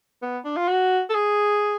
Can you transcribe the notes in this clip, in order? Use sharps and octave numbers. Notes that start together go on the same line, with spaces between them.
B3
D4
F4
F#4
A4
G#4